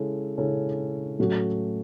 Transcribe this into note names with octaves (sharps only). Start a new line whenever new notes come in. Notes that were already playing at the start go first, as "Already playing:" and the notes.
Already playing: C#3 G#3 C#4 E4 A4
C#3 G#3 C#4 E4 A4
A2 F#3 A3 C#4 F#4